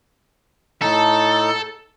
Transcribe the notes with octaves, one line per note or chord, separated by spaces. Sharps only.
A2 D#4 A4